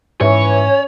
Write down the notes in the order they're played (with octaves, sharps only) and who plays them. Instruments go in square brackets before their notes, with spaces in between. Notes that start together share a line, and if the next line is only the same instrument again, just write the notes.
[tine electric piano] G#2 [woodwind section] E3 [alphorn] C#4 [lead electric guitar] C#5